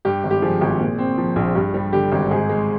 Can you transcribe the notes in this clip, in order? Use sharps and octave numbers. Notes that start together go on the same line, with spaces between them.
G2 G4
G#1
G4
F3 G#4
G#1
A#2
C4
F3
A#1
G2
G3
D3 G4
G#1
G#2 G#4
G#3